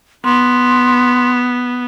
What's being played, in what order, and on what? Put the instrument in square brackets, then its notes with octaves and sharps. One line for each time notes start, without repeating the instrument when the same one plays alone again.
[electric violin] B3 [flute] C6